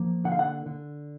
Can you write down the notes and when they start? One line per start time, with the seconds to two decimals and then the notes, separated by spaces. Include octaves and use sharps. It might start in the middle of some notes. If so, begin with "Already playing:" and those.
Already playing: F3 A#3
0.24 D3 F#5
0.32 F5
0.39 F#5
0.66 D3